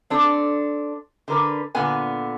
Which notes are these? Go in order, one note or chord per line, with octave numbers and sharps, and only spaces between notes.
C4 D4 A4
D3 A#4 B4
A#2 D3 B3 G#5